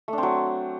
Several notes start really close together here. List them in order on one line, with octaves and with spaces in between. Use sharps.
A3 D4 C4 F#3